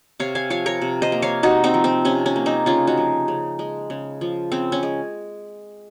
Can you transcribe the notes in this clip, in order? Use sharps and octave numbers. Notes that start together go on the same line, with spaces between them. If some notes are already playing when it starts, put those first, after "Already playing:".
C3 C#5 F5
F5 G#5
F3 C#5 F5
A#4 C#5
C3
C5 D#5
A#3
C#5 F5
C3 D#4 F#4
C4 D#4
F3
C4
C3 C#4
C#4
A#3
C4 D#4
C#3 C#4 F4
D#4 F#4
F3
C#3
G#3
C#3
F3
C#3 C4
C#4
G#3